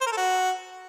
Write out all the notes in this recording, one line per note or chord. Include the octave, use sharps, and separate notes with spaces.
C5
A#4
A4
F#4